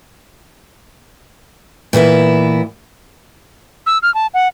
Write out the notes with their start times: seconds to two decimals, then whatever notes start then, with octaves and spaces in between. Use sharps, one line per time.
1.93 A#2 E3 B3 E4
3.86 E6
4.03 F6
4.14 A5
4.34 F#5